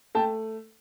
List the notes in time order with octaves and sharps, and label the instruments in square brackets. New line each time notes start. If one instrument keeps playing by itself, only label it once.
[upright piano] A3 G5 A5